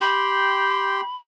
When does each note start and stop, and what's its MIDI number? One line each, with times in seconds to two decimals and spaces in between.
0.01 1.01 67
0.01 1.01 79
0.01 1.16 83
0.01 1.01 84